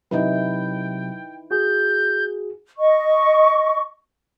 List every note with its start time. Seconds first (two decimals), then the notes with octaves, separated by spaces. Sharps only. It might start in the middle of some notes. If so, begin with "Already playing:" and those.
0.11 C3 F#3 D#4 E4 B4 G5
1.51 F#4 G#4 G6
2.78 D#5 C#6